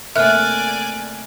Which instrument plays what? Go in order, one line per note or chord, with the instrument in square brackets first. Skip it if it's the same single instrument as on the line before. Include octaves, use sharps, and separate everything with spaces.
[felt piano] C3 A3 A#3 [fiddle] D5 G#5 [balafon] E5 [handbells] F6 F#6